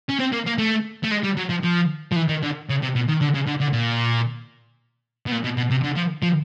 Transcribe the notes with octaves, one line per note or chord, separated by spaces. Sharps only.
C#4
C4
A#3
A#3
A3
A3
G#3
G3
F#3
F3
F3
F3
E3
D#3
D3
C#3
C3
B2
D#3
D3
C#3
D3
D3
A#2
B2
A#2
B2
B2
C3
D3
F3
F3